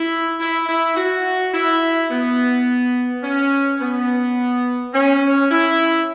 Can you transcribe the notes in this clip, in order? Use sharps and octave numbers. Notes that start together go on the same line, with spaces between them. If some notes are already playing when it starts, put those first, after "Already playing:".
Already playing: E4
E4
E4
F#4
E4
B3
C#4
B3
C#4
E4